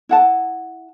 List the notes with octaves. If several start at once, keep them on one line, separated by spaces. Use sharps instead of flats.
E4 F#5 A5